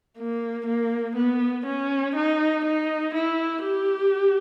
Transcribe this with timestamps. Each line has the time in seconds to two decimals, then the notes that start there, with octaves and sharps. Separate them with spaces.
0.17 A#3
0.66 A#3
1.16 B3
1.66 C#4
2.15 D#4
2.64 D#4
3.14 E4
3.63 G4